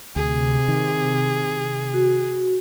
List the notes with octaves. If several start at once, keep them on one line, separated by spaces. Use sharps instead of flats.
D2 C3 G#4
D#3
F#4